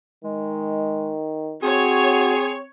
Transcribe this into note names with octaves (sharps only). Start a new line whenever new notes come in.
D#3 G#3
C4 F#4 G#4 C#5